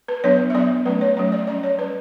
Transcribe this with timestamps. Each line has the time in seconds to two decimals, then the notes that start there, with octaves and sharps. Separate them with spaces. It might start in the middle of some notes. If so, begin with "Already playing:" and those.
0.08 B4
0.24 F#3 B3 D4 C#5
0.50 E5
0.54 F#3 B3 D4 D5
0.85 F#3 A3 C#4 B4
1.01 C#5
1.17 F#3 A3 C#4 C#5
1.32 D5
1.47 G3 C#4 D5
1.63 C#5
1.78 C#4 B4
1.81 G3